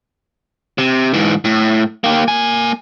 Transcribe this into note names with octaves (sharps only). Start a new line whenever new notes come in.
C3
G#2 E3
A2
A#3 G4
A#3 G#5